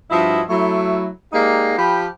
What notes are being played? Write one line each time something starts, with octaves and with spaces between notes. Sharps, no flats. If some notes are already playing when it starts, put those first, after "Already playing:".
G2 F3 E4 F#4 D#5 E5
F#3 A3 E4
G#3 A#3 D#4 G4 D5 F5
F3 G4 G5 B5